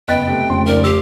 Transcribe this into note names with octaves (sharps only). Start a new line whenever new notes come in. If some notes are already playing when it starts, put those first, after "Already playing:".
F#1 B3 D#5 G5 F#6 A6 B6
C3 A3
F1 C#3 C6
C#2 D#4 A#4 D5
G4 E6 C7